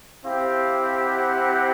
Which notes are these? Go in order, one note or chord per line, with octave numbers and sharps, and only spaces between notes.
C4 E4 G4 F5
F#5